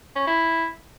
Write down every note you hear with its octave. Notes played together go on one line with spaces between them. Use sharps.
C#4
E4